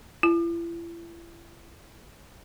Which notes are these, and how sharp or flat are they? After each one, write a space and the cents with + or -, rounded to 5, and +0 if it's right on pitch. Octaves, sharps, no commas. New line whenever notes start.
E4 +40